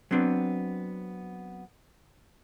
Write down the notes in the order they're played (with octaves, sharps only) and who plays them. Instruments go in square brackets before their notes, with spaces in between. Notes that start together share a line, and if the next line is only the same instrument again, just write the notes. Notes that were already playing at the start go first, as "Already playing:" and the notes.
[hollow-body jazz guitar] F#3 B3 C4 D4